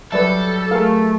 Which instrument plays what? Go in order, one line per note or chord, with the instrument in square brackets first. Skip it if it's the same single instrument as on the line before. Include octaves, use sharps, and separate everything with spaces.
[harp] F#3 [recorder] G3 [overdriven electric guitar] A4 [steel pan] B4 D5 E5
[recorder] A3 [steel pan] G#4 A#4 F5